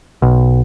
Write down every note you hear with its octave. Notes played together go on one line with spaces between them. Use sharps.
B1